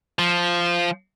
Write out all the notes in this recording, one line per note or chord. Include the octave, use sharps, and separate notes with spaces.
F3